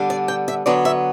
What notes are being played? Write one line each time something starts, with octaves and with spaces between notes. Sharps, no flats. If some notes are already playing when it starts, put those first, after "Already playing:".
Already playing: D3 G3 B3 D4
D5
G5
E5
D3 F#3 B3 D4 D5
E5